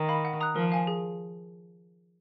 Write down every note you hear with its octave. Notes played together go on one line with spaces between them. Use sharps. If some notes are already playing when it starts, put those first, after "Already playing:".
Already playing: D#3
F5 B5
F#5
A#5 D#6 F#6
F3 A#4
F5 G#5
G#4